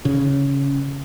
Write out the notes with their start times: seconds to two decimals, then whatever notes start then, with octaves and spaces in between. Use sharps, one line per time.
0.05 C#3